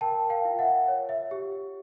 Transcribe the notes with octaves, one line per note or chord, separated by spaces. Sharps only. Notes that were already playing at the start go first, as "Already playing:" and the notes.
A#4 G5 A5
F5 G5
F4
E5 F#5
C#5
E5
G4